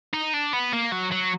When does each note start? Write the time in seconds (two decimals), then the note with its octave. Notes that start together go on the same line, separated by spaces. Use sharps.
0.13 D#4
0.34 D4
0.53 B3
0.73 A#3
0.92 F#3
1.12 F#3